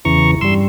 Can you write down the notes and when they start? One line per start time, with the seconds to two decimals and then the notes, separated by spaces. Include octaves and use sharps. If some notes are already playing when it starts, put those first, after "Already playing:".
0.05 E2 C#3 E3 A#5 C#6
0.41 G2 G3 C6 E6